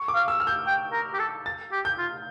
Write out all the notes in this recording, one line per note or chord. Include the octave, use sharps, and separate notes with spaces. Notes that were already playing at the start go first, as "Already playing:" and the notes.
Already playing: C#6
D6
F5
E6
F6
G6
G5
A#4
G4
A4
A6
G4
G6
F4